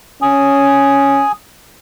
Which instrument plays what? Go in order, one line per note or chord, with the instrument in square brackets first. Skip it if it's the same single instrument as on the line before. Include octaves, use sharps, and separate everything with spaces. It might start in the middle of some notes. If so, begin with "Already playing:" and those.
[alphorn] C#4 [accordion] G#5 D#6